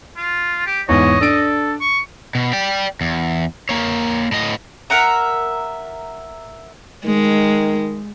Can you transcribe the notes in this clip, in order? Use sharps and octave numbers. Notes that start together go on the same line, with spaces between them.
F4
G4
E2 G#2 C#5 D#5
D4 A4 D7
C#6
B2
D5 G5
E2
A#3 C#5
A2 D#5
A#4 E5 F#5 A#5
D#3 G#3